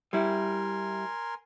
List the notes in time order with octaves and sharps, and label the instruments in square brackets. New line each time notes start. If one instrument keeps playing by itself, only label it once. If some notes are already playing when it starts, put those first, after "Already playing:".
[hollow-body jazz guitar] G3 E4 [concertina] A#4 G#5 C6